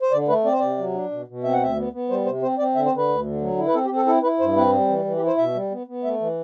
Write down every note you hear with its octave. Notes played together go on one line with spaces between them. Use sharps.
C5
D3 D5
A3 B4
C4 D5
C5
C3 D5
F#3
D4
B2
B2
C4 E5
F#5
D2 E5
B3
B3
G3 C5
C3 C5
C4 C5
C4 D5
D3 E5
C5
D3
B4
D2
D3
F#3
E4
B4
C4 A4
G4
C4
A4
E4 A4
E4 B4
G2 C5
C4 B4
G3
E3
E3
G4
E4
C5
B2 E5
G3
B3
B3
A3 E5
E3